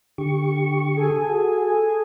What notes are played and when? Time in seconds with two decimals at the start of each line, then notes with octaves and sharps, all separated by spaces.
0.18 D3 G4 C#6
0.96 G#4 A4 G#5
1.30 F#4